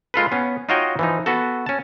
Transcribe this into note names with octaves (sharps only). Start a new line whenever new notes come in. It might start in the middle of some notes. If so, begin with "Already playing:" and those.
G#3 F4 A4 B4
B3 C#4
D#4 F4 F#4 C#5 D#5 G5
E3 F3 D#4
B3 F#4 A4
C#4 A5